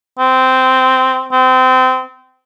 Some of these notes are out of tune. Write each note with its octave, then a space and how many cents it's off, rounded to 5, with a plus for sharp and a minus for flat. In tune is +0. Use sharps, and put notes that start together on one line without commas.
C4 -10
C4 -25